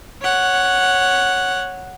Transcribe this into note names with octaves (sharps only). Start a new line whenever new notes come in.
C#5 F#5